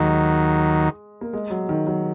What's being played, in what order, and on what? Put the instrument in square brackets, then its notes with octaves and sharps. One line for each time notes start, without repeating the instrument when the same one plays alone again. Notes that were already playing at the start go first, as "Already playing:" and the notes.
Already playing: [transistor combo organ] D#2 D#3 F#3 [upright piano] G#3
[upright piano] A#3
G#3
F#3
D#3
F#3